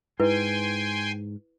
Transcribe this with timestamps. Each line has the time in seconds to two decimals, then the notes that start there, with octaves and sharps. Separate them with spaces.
0.20 G#2 E4 B4 G5 G#5 C6